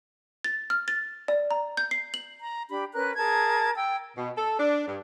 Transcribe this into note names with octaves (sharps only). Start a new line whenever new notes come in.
A6
F6
A6
D5
A#5
G6
C7
F#7
A#5
D4 G4 B5
C#4 A#4 B4 F#6
G#4 A#4 A5 G#6
G5 E6
B2
A4
D4
G2